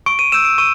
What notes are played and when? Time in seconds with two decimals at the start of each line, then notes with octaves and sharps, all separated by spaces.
0.06 C#6 D7
0.19 D#7
0.32 E6 G6 E7
0.45 D7
0.58 C#6 D#7